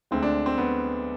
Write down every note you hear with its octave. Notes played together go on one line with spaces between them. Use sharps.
D2 D3 G#3 C4
D4
C4
B3